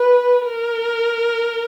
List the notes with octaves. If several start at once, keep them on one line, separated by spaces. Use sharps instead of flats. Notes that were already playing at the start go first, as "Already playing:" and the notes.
Already playing: B4
A#4